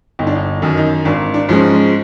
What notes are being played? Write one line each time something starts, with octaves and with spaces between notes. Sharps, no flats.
G1 D#4
D4
D#4
F#2 D#3
D#4
G#1 D4
D4
G#2 F3 G#3 C#4